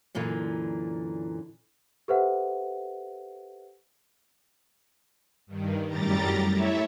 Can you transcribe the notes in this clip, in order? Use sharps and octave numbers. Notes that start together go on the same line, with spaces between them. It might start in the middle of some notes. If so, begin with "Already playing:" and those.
F#2 A#2 D3 E3
G4 A4 B4 C5 E5 F#5
G2 D#3
F#2 A2 G3 G4 A#5 A6
A3 E4 C#5 E5